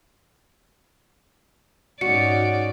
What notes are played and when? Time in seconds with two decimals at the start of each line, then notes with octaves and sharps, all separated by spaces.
2.01 G#2 C#4 D#4 F#4 D5 C#7